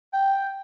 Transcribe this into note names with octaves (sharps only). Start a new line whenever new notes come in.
G5